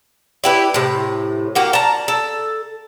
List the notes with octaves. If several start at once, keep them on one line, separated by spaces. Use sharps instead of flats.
E4 G4 B4
A2 C3
A#3 F#4 G4
A5 A#5
A4